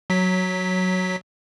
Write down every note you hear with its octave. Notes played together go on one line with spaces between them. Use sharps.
F#3 B6